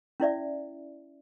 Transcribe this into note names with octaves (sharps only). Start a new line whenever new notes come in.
C#4 E4 D5 E5